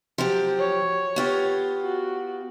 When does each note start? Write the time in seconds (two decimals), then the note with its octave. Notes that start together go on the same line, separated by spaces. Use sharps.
0.18 F3 F#3 G4
0.59 C#5
1.16 B3 F4 G4
1.83 F#4